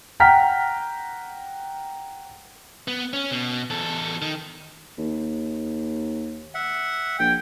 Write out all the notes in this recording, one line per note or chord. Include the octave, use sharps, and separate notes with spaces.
F#5 G5 A#5 F6 B6
B3
C#4
B2
E2 A4
D#3
D#2
E5 F#5
A#1 G5